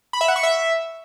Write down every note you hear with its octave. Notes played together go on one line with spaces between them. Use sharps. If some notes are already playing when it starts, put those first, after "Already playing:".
B5
E5
F#5
C#6
E5